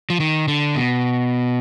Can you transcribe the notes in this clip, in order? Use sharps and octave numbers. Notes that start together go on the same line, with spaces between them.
F3
D#3
D3
B2